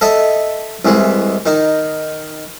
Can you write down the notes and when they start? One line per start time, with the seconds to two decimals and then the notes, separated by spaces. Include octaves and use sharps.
0.01 A4 D#5 E5
0.85 C2 E3 G#3
1.46 D#3 D#4